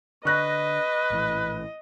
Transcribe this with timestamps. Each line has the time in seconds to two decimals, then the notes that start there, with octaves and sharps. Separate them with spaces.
0.25 D3 B4 D#5 C#6 F#6 A#6
1.10 A#1 A2 E3